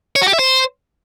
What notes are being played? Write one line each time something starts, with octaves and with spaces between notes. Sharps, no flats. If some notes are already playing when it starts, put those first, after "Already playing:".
C#5
F#4
G4
E5
C5